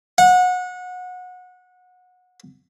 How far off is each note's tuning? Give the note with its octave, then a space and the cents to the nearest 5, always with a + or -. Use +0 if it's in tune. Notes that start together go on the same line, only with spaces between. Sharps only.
F#5 -25